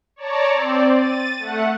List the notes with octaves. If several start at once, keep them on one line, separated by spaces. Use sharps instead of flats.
C#5 D5 A5 A#5
C4 D5
A6 D#7
A3 F#5